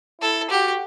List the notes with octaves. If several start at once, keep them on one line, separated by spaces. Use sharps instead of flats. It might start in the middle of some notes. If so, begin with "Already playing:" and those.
E4 A4
F#4 G4